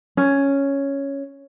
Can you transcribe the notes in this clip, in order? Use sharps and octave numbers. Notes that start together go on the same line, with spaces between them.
C#4